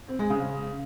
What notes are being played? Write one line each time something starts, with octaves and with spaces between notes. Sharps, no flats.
C4
G#3
C#3